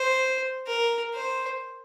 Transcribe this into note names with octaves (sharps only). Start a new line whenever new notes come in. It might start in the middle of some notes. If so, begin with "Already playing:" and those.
Already playing: C5
A#4
C5